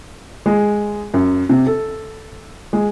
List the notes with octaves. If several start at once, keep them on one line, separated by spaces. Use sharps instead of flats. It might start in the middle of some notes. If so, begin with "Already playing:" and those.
G#3
F#2
C3
A4
G#3